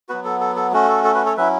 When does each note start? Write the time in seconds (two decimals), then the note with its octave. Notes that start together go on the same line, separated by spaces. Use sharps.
0.09 F#3 B3 F#4 B4
0.25 A4
0.41 A4
0.56 A4
0.73 A3 C#4 F#4
0.88 A4
1.04 A4
1.15 F#4 B4
1.26 A4 C#5
1.37 F#3 C#4 E4 B4 E5